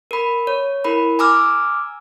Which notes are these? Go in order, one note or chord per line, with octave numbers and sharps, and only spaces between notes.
A#4 B5
C#5
E4 A#4 B5
G#5 A#5 D6 E6 F6